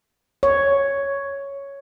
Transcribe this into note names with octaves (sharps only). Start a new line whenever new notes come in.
C#5